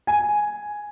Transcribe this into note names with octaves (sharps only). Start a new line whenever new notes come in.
G#5